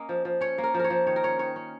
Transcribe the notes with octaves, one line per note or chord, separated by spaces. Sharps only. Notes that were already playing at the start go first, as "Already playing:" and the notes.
Already playing: A#3 C#4 D#5
F3
F3
C#4 C#5
A#3
A#4
F3
A#4 C#5
F3
D#3 C#5
A#4
C#4 C#5
D#3 C#5
C#4